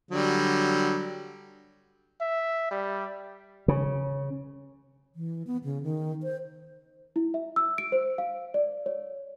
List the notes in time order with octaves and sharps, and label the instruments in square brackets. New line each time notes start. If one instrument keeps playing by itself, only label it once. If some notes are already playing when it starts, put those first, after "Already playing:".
[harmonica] D3 F#3 G3
[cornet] E5
G3
[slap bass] C#3
[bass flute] E3
B3
C#3
D#3
C5
[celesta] E4
E5
E6
D7
C5
F5
D5
C#5